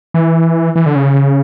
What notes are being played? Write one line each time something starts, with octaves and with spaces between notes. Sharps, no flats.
E3
E3
D3
C#3